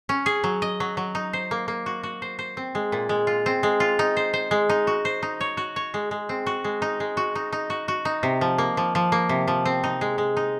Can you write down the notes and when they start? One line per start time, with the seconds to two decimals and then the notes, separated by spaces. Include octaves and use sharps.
0.09 C#4
0.26 G#4
0.44 F#3
0.62 D#5
0.80 F#3
0.97 F#3
1.15 D#4
1.33 C5
1.51 A#3
1.68 A#3
1.86 F#4
2.03 F#4
2.22 C5
2.39 C5
2.57 C4
2.75 G#3
2.92 A#2
3.09 G#3
3.27 F4
3.46 C4
3.63 G#3
3.80 F4
3.99 D#4
4.17 C5
4.33 C5
4.51 G#3
4.69 D#4
4.87 F#4
5.05 C5
5.22 D#4
5.41 C#5
5.57 F#4
5.76 C#5
5.94 G#3
6.11 G#3
6.29 C4
6.46 F#4
6.64 G#3
6.82 D#4
7.00 G#3
7.17 F#4
7.35 D#4
7.52 D#4
7.70 F#4
7.88 F#4
8.05 D#4
8.23 C3
8.41 F3
8.58 A#3
8.77 F3
8.95 F3
9.12 A#3
9.29 C3
9.48 F3
9.65 C4
9.84 D#4
10.01 G#3
10.18 G#3
10.37 D#4